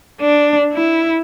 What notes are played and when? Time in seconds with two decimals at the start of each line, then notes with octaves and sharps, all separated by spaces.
0.21 D4
0.73 E4